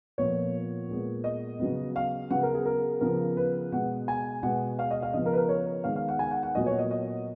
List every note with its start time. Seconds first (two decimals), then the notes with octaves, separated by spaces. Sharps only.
0.18 A#2 F3 B3 C#5
0.88 A#2 G#3 B3
1.24 D#5
1.59 C#3 F#3 B3
1.96 F5
2.30 C#3 F#3 B3 F#5
2.43 A#4
2.54 G#4
2.66 A#4
3.01 C#3 F3 B3 A#4
3.37 B4
3.72 B2 G#3 B3 F#5
4.08 G#5
4.42 B2 G#3 B3 F#5
4.79 F5
4.91 D#5
5.02 F5
5.13 C#3 F3 B3 D#5
5.26 A#4
5.33 B4
5.37 A#4
5.49 C#5
5.84 D#3 G#3 B3 F5
5.96 F5
6.08 F#5
6.19 G#5
6.31 F#5
6.43 F#5
6.55 A#2 F#3 B3 D#5
6.66 C#5
6.79 D#5
6.91 D#5